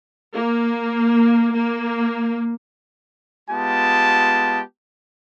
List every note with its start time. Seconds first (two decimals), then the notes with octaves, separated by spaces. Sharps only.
0.34 A#3
1.54 A#3
3.50 G#3 B3 F4 G4 A5